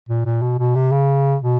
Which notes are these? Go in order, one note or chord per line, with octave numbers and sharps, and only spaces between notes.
A#2
A#2
B2
B2
C3
C#3
B2